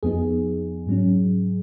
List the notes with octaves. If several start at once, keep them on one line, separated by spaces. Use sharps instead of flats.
F2 F3 B3 D#4 G#4
G#2 F#3 C#4